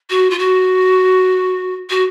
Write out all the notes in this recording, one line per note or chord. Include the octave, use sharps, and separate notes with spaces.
F#4
F4
F#4
F#4